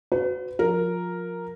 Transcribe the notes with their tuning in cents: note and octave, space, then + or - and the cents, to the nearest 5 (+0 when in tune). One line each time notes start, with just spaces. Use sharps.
F#4 +0 B4 +40
F3 +25 A#4 +0